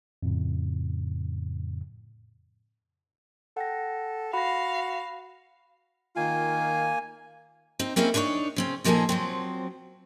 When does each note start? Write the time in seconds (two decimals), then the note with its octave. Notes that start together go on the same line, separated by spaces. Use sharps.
0.23 F2 A2 C#3
3.57 A4 F#5 G5 A#6
4.33 F#4 F5 B5 A#6
6.16 D#3 A#3 F4 G#5
7.79 C4 D#4
7.96 A#3 C4 C#4 D#4 E4 G#4
8.14 D4 D#4 A4 B4 C#5 D5
8.56 C#3 C4 C#4
8.84 A#2 F3 A#3 D#4 G#4 A4
9.09 F3 F#3 C4